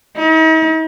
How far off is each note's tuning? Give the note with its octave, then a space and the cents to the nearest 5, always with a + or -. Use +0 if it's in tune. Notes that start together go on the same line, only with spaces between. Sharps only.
D#4 +45